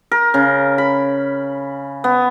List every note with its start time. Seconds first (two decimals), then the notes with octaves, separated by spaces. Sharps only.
0.11 A#4
0.34 C#3
0.78 B5
2.04 B3